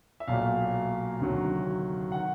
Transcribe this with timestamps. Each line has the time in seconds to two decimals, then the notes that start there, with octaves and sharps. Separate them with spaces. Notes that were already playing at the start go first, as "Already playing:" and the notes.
0.20 E5
0.28 B1 A#2 F#3 F5
1.20 D2 C3 D#3 F#3
2.12 D#3 F#5